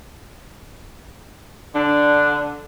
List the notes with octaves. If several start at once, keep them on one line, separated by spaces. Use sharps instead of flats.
D3 D4